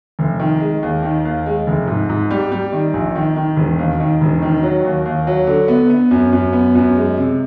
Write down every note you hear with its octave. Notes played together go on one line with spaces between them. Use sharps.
F1
D#3
G#3
D#2
D#3
D#2
G#3
F1
G#2
G#2
G3
G3
D#3
A#1
D#3
D#3
E1
D#2
D#3
E1
D#3
F#3
D#2
D#2
F#3
D3
B3
B3
F#2
F#2
B3
F#2
G#3
C3